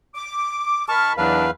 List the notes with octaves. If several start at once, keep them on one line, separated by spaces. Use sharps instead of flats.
D6
D#3 A5 B5 C#6 F6
E2 D#3 F#3 D4 B4 F5